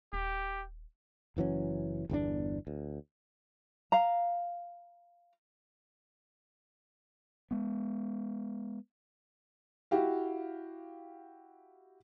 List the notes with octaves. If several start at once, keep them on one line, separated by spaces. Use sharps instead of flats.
D#1 G4
F#1 E3 F#3 C#4
G1 E2 A#2 D4
D2
F5 A#5
G#3 B3
E4 F#4 G4 F5